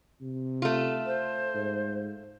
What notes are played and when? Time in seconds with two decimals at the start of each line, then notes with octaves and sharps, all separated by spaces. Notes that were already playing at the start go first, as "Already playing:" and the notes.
0.21 C3
0.62 A3 F4
1.06 C5
1.54 G#2